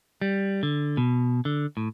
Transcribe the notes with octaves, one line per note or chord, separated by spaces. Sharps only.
G3
D3
B2
D3
A2